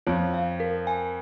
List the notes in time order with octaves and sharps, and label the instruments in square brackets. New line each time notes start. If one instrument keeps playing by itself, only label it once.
[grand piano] F2 F3 [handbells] C#5
[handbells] F5
A#4
G#5